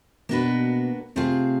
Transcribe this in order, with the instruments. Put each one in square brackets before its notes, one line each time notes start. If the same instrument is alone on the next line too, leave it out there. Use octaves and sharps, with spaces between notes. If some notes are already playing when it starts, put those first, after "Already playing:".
[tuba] B2 [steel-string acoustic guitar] A#3 D4 F#4 B4
[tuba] C3 [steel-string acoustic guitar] A3 C4 F4 G#4